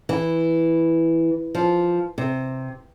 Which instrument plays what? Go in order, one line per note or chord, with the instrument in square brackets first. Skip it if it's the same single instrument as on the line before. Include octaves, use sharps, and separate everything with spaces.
[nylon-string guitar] E3
F3
C3